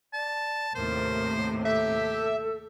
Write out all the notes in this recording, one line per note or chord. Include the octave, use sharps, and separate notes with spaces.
D5 A5
D#2 A2 C3 A#4 C5
G4 A4 E5